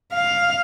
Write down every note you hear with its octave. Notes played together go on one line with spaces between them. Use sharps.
F5